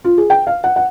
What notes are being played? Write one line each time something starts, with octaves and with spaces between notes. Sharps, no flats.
F4
G#4
G5
F5
F#5
F#5